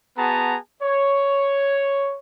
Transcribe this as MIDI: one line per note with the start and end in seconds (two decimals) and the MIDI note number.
0.17 0.57 59
0.17 0.57 66
0.17 0.57 68
0.17 0.57 81
0.17 0.57 82
0.83 2.18 73